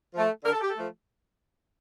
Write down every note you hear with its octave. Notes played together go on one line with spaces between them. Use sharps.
F3 A3
D3 A#4
A4
G4
A4
F3 A3